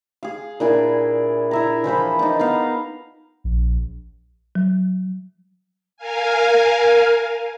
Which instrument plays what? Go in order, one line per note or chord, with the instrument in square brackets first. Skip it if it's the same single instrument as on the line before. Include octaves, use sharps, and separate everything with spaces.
[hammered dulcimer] G#4 F5
A#2 D4 E4 G#5
E4 E5 A#5
E3 F3 C5 B5
D4 D#4
B3 D#5 F5
[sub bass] A#1
[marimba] F#3
[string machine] A#4 F5 G#5